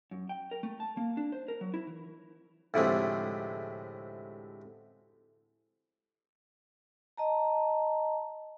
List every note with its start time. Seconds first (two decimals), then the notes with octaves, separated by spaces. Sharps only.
0.11 F#2
0.29 G5
0.51 A#4
0.63 A3
0.80 A5
0.97 A#3
1.17 D4
1.32 C5
1.48 A#4
1.61 F#3
1.74 E4
1.87 E3
2.74 D2 A2 C3 F3 G#3 A3
7.17 D#5 A5 A#5